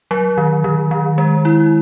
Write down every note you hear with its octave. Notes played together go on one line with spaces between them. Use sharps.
F#3
D#3
D#3
D#3
G#3
E4